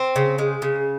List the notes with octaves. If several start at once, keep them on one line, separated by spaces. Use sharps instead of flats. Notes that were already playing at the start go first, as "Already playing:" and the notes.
Already playing: C4
C#3
G#3
C#3